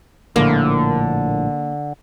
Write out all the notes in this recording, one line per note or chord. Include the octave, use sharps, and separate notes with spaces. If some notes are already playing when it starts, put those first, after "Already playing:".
A#1 A2 D3 A#3